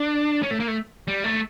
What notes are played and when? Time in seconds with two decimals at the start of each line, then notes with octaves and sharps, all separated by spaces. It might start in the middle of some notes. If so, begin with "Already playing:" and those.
Already playing: D4
0.43 C#4
0.51 A3
0.60 A#3
0.68 A3
1.08 G3
1.24 A3